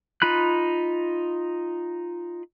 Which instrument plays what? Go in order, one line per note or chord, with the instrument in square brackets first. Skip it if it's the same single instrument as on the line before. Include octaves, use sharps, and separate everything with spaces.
[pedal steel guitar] D#4 F4 B5 F#6